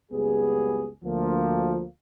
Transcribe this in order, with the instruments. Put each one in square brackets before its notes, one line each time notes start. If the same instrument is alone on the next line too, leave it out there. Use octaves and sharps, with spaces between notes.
[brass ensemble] F#1 C#2 G3 B3 G#4
D2 F3 A#3